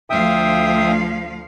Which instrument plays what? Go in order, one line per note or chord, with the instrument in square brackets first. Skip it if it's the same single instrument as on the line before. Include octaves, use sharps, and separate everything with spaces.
[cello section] D2 F3 F5 [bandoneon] E5 G5 D#6